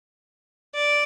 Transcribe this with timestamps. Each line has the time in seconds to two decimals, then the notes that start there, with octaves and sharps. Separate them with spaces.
0.75 D5